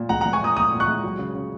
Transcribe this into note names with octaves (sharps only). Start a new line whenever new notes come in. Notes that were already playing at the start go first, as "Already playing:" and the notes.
Already playing: A#2
G#3 F#5 A#5
G#3 F#5 A#5
G#5 C#6
A#2 A#5 D#6
A#2 A#5 D#6
A#2
C#6 F#6
G#3
F#3
C#3
C#3